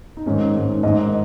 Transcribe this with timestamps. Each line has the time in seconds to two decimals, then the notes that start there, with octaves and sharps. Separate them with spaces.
0.17 D#4
0.26 G#2 D#3 C#4
0.55 G#2 D#3
0.83 G#2 D#3 D#5